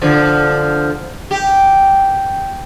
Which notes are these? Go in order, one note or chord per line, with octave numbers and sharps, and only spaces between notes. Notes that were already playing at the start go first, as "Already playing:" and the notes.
D3 F3
G4